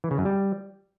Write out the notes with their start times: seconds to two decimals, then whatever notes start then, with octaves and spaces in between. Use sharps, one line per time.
0.04 E3
0.11 C#3
0.18 F#2
0.25 G3